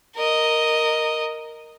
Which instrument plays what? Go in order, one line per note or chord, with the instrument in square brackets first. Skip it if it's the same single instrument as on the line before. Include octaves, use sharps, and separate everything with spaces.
[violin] A#4 D#5